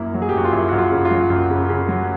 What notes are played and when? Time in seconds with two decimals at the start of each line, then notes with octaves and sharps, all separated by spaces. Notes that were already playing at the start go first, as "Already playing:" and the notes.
Already playing: F#2 A#3 E4
0.14 F#3
0.22 G#4
0.29 G4
0.33 F#2 F#4
0.44 F4
0.53 F#2 E4
0.69 F#2 F#4
0.78 F4
0.91 C#3
1.05 F4
1.11 F#3
1.30 F#2
1.50 C#3
1.69 C#3
1.88 F#3